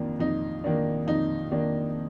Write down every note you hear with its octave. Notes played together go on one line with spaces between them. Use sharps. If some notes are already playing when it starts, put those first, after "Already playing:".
Already playing: F2 D#3 A#3 D4
F2 D#4
D#3 A#3 D4
F2 D#4
D#3 A#3 D4